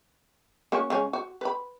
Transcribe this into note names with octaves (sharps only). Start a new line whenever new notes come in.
A#3 C#4 F#4
C#3 G#3 C#4
F#4
B4 B5